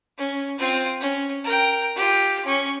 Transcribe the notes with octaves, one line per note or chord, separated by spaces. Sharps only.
C#4
C4 F4
C#4
A#4 G5
F4 G4
C#4 C#6